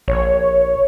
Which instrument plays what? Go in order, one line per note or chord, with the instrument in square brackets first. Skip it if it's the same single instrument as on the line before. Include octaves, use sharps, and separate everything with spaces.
[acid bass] A#1 [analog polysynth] C#5